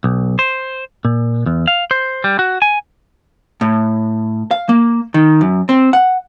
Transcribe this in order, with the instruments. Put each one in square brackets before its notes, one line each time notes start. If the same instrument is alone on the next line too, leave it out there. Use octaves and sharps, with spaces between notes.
[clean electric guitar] B1
C5
A#2
E2
F5
C5
G3
F#4
G#5
[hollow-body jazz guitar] A2
F5
A#3
D#3
F#2
C4
F#5